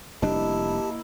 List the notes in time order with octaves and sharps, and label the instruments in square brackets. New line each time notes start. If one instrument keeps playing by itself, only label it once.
[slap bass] F1 G3 D4 [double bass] A#3 E4 [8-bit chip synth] G4 A5 [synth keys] D#5